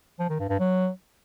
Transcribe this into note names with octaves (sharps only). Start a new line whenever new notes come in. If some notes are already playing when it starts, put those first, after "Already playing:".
F3
D#3
G2
G2
F#3